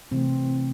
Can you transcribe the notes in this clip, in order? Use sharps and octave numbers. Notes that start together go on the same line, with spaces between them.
C3 E3 A3 C4